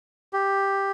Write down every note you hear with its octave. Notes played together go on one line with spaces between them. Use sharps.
G4